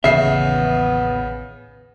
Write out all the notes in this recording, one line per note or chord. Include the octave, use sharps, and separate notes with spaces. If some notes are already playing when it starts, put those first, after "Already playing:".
A1 D#2 C#3 E3 B3 E5 C7